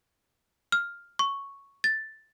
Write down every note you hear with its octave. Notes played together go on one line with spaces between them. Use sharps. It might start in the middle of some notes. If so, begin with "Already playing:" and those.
F6
C#6
A6